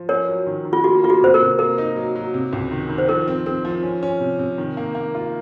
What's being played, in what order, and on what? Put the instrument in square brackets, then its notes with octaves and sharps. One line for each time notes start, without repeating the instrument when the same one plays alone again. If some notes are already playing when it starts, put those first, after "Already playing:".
Already playing: [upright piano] F3
[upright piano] C#4 [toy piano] A#4 C#5
[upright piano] F#3
D#3
D#3
[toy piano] F4
[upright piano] A#3 [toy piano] F#4
[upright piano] A#3 [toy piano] F4
[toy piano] F#4
[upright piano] C3 [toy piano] C5
[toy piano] A#4
[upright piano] C3
[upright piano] A#3 [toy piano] A#4
[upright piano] D#4
F#3
F#3
C3
C#2
D#3
D#3
[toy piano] C5
[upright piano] F3 [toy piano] A#4
[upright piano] C4
[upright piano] C4 [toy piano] A#4
[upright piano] F3
C#4
C#4
C3
C3
D#3
A#3
A#3
F4